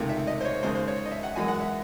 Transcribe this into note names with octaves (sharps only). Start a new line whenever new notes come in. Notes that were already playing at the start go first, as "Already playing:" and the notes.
Already playing: C#2 C3 D#3 A3
E5
D#5
C5
C#5
D#2 C#3 G#3 C5
C5
C#5
D#5
E5
F#5
F#2 E3 G#3 G#5
F#5
E5